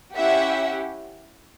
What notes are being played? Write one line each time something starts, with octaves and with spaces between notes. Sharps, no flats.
C#4 E4 G4 E5 F#5